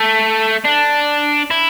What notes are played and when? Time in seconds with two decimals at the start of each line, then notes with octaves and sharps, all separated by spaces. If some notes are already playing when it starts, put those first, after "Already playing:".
Already playing: A3
0.65 D4
1.51 E4